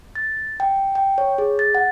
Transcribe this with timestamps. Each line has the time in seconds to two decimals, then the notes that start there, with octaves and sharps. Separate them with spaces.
0.15 A6
0.60 G5
0.95 G5
1.18 C#5
1.38 G#4
1.59 A6
1.75 F#5